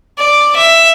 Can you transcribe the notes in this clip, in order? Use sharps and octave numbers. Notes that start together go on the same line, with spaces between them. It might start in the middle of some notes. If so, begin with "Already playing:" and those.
D5
E5